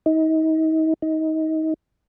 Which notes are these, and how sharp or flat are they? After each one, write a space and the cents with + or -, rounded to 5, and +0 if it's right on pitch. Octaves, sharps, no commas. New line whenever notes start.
D#4 +35
D#4 +25